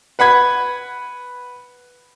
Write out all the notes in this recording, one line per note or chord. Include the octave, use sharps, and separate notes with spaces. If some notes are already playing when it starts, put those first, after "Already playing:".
B4 F#5 B5 G#6